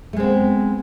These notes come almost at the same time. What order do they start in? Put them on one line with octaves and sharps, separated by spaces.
A3 G#3 C4 B3